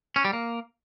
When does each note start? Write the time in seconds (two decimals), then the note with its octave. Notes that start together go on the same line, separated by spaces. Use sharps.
0.16 C#4
0.25 G3
0.33 A#3